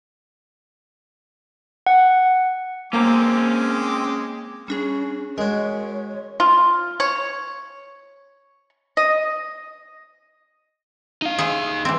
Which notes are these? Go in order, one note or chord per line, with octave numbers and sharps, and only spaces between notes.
F#5
G#3 A#3 C4 C#4 A#4 A#5 D6
G3 C#4 D4 G#4
G#3 F#4 A#4 C#5
F4
C#5
D#5
D#4 F5
G#4 C5 E5
E3 C4